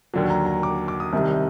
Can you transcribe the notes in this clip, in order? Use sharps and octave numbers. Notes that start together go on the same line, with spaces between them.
D#2 D3 F#3
A#5
A#5
D6
D6
D#6
C2 C3 D#3 G3